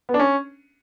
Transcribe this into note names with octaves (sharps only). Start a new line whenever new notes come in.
B3
D4
C#4